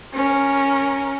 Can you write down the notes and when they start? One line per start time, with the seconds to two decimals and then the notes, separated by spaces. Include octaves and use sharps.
0.14 C#4 A#4